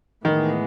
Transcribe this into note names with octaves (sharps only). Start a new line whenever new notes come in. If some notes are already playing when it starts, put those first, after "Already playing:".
A2 D#3 E3 G#3 B3